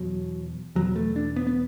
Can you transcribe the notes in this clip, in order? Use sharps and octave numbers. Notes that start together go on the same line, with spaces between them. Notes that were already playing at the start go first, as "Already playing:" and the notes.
Already playing: E2 B2 F#3
E2 B2 F#3
A3
D4
B3
B3